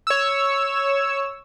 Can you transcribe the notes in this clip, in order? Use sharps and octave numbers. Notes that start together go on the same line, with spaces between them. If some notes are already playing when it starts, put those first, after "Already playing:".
C#5 E6